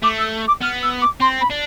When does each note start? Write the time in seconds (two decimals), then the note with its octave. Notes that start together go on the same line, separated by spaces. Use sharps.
0.02 A3 D6
0.18 E6
0.47 D6
0.61 B3 F6
0.82 E6
1.01 D6
1.20 C4 C6
1.40 B5
1.51 D4